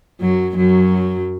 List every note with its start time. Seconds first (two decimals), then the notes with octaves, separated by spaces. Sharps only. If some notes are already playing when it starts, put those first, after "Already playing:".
0.21 F#2 F#3
0.56 F#2 F#3